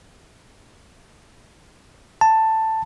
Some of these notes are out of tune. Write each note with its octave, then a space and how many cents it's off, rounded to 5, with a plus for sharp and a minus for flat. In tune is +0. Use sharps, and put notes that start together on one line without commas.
A5 +10